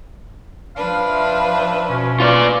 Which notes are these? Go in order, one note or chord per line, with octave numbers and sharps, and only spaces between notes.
F3 D4 B4 F5
C5 E5
B2 C#4
F4 B4 C#5 D5 G#5